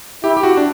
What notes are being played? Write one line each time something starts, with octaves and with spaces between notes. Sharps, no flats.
E4 G4
G4
F#4
D4